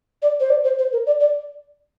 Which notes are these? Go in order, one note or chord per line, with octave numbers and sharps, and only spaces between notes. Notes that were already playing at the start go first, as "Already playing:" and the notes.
D5
C5
D5
C5
C5
A#4
D5
D5